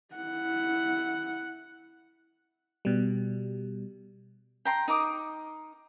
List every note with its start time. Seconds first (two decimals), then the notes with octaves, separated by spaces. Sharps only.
0.14 E4 F#5
2.85 B2 G3
4.65 G5 A#5 C6
4.88 D#4 A#4 D6 D#6